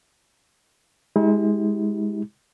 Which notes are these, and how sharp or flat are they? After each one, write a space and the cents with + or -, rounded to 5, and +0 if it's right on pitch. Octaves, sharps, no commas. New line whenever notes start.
G#3 +0 E4 -45 G4 -15